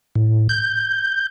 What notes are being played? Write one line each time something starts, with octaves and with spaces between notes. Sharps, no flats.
A2
G6